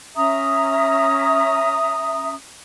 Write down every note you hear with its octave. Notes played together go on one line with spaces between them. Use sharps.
C#4 E5 A#5 D#6